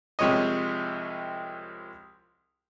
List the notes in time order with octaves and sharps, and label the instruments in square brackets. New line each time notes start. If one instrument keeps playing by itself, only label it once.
[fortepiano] C2 C3 F3 G#3 C#5 D#5